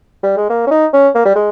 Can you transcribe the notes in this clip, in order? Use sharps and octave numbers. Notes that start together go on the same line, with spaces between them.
G3
G#3
A#3
C#4
D#4
C#4
A#3
G3
G#3